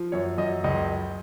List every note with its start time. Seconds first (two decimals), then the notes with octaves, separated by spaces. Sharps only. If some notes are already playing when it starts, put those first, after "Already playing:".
Already playing: F3
0.12 F#2 C#5
0.38 F#2 D#5
0.64 C#2 D#5